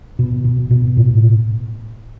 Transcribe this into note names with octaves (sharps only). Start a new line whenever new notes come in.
B2
B2
B2
A2